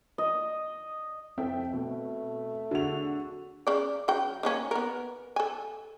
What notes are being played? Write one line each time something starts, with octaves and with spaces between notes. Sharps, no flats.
D#5
F2 C4 A4 E5 G5
B2 A3
D3 F#4 G#4 F7
C#3 D5
C#3 F#3 G5
D#3 A#3 C#4
B3 A#4
A4 G#5